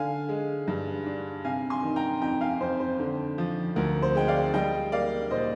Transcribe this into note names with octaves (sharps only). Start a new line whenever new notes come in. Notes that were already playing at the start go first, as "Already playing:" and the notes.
Already playing: D3 F5 G#5
G#3
G2
D4
C3 F5 G#5
G#5 C6
D#3
G5 A#5
F2 G5 A#5
F5 G#5
F2 C5
C5
D3
F3
D2 A#4
C5
G#3 G5
D5 F5
G3 D#5 G5
A#3 D5 F5
A#2 C5 D#5